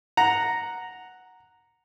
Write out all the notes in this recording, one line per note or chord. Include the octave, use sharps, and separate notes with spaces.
F#5 A#5